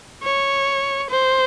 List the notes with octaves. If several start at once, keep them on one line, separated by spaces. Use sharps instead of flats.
C#5
C5